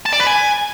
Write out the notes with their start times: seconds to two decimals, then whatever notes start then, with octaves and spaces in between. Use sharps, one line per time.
0.06 A5
0.13 D5
0.20 B4
0.27 G#5